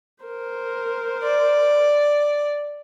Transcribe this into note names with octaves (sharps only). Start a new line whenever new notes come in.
A#4 C5
D5